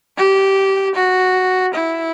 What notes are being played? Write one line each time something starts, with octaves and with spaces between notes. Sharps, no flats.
G4
F#4
E4